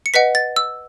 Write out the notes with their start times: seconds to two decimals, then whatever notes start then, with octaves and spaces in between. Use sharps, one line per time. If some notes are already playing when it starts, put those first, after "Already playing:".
0.06 C#7
0.14 B4 D#5 F#5 B6
0.35 A6
0.56 E6